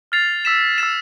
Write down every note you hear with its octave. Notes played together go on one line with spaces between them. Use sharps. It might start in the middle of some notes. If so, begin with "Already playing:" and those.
F6 A6 C7 F7
E6 B6 E7
E6 A6 E7